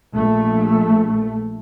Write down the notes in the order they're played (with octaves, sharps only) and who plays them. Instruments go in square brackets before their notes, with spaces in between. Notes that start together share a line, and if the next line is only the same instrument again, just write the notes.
[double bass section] A#1 A3